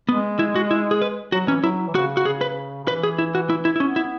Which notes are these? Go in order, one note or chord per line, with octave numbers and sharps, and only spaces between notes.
G#3 B3
E4
F#4
E4
G#4
B4
F#3 F#4
E3 C#4
F#3 E4
E3
C#3 F#4
F#4
C#3 G#4
B4
C#3
E3 B4
G#4
E4
F#4
E4
E4
E4
B3 C#4
E4